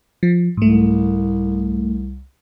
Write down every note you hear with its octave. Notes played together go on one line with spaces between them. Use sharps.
F3
C2 G#2 A3